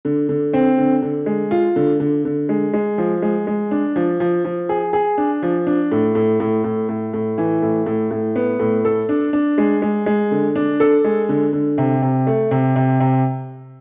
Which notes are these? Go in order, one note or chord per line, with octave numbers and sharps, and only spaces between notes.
D3
D3
C4
D3
D3
G#3
F4
D3
D3
D3
G#3
G#3
F3
G#3
G#3
D4
F3
F3
F3
G#4
G#4
D4
F3
D4
A2
A2
A2
A2
A2
A2
E3
A2
A2
A2
B3
A2
A4
D4
D4
G#3
G#3
G#3
D3
D4
A4
G#3
D3
D3
C3
C3
A3
C3
C3
C3